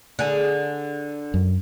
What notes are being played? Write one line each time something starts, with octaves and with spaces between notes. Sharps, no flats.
D3 G#4
F#2